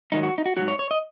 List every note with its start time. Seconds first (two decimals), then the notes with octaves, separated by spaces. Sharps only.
0.12 G#2 D#3 F#3 D#4
0.23 F#4
0.38 D#4
0.46 F#4
0.57 G#2 D#3 F#3 F#4
0.68 C#5
0.79 C#5
0.91 D#5